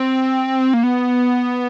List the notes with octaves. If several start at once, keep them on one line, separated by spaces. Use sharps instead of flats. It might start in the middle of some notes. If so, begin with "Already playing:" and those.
Already playing: C4
A#3
B3